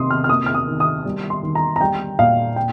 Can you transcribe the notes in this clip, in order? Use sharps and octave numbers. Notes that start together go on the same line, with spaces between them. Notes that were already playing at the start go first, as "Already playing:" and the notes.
Already playing: C3 D#3 C6 D#6
F6
F6
A#3 D#6
F6
D#6
D#3
D#6
G3
C6
D#3
A#5
A#5
G3 G5
A#2 F5
G5